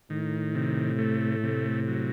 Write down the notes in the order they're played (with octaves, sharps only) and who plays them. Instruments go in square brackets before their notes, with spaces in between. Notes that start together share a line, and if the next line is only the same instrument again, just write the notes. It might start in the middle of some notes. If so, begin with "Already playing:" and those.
[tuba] A2 [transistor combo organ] D#3
[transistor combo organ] C3
A3
C3
F#3